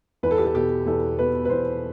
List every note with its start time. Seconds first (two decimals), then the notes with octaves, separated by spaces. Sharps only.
0.23 E2 B4
0.31 A4
0.38 G4
0.45 A4
0.54 B2 G4
0.86 E2 A4
1.18 B2 B4
1.45 B4
1.50 E2 C5